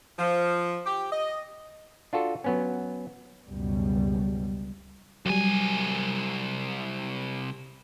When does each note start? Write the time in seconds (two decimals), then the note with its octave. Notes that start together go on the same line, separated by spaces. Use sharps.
0.18 F3
0.85 G4
1.12 D#5
2.13 D4 F4 F#4 A4
2.44 F#3 B3 C#4
3.45 C#2 F#2 B2 G3
5.26 C2 F#3 G3 G#5